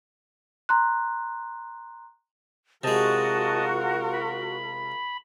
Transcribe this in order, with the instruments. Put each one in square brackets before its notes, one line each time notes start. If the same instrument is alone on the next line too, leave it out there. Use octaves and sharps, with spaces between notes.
[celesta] A#5 C6 F#6
[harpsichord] C3 G#3 [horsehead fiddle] F4 A#4 [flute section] F#4 [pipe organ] D#5 A5
[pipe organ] B5